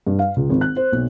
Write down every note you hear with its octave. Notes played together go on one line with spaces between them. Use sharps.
G2
F5
C#2
G#1
F#6
C5
B1